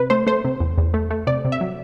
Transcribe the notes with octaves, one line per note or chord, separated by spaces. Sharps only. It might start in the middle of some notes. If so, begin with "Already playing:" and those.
Already playing: C3 B4
A3 C5
A3 C5
C3
E2
E2
A3
A3
C3 D5
C3
E5
F#3